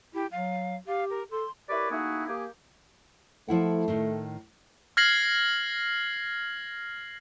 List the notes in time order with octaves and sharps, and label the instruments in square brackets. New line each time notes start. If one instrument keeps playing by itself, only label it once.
[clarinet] E4 [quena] G4
[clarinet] F#3 [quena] F5
[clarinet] G4 [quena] F5
[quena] A#4
[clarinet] A4 [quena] C6
[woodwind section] E4 G4 A#4 B4 C#5 D5
A3 A#3 D#4 E4 F#4 G#4
A#3 G4 G#4
[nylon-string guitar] F3 E4 F#5 [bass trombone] A3
[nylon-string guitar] A2 D#3
[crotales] F6 G#6 A#6 C7 F#7